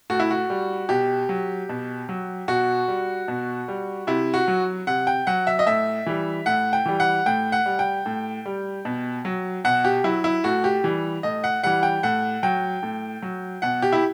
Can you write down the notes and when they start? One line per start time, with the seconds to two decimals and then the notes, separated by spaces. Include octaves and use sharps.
0.10 A2 F#4
0.20 E4
0.31 F#4
0.50 G3
0.89 B2 G4
1.29 F#3
1.69 B2
2.09 F#3
2.48 B2 F#4
2.88 G3
3.28 B2
3.68 G3
4.07 C3 E4
4.34 F#4
4.48 F#3
4.87 C3 F#5
5.07 G5
5.27 F#3 F#5
5.47 E5
5.59 D#5
5.66 A2 E5
6.06 E3 G3
6.46 A2 F#5
6.73 G5
6.86 E3 G3
7.00 F#5
7.26 A2 G5
7.52 F#5
7.66 G3
7.79 G5
8.06 A2
8.46 G3
8.85 B2
9.25 F#3
9.64 B2 F#5
9.85 G4
10.04 F#3 E4
10.24 E4
10.44 A2 F#4
10.64 G4
10.84 E3 G3
11.23 A2 D#5
11.44 F#5
11.63 E3 G3 F#5
11.83 G5
12.03 A2 F#5
12.43 F#3 G5
12.83 A2
13.22 F#3
13.62 B2 F#5
13.82 G4
13.92 E4